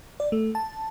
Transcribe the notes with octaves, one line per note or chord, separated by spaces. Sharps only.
D5
A3
A5